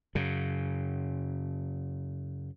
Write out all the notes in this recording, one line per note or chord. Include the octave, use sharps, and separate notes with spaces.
F#2 C#3